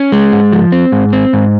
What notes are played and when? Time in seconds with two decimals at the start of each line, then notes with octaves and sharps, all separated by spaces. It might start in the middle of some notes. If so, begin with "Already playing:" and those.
Already playing: C#4
0.12 G#3
0.32 G#2
0.52 F3
0.72 C4
0.92 G#2
1.13 C4
1.33 G#2